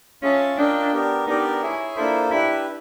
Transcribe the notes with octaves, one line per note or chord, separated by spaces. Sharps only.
C#4 F4 G#4 C#5 E5 A5
D4 F4 A#4 D#5 G5
B3 D4 G4 A#4
B3 D4 D#4 G4 A#4 D5
E4 G#4 C#5 E5 G#5
A#3 D4 E4 F4 A4 C5
D4 E4 G4 B4 E5